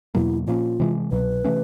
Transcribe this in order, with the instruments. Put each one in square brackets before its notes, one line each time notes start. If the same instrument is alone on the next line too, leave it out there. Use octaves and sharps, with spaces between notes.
[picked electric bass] E2 B2 F#3 A#3 [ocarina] E4
[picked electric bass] A#2 F3 A#3 C#4 [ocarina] F4
[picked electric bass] C3 E3 G#3
[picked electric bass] C2 B2 F#3 [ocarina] B4
[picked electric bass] C3 E3 A3 C#4